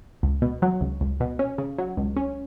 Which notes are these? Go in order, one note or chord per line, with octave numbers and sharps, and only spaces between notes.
C#2
B2
F#3
C#2
C#2
B2
C#4
C#3
F#3
C#2
C#4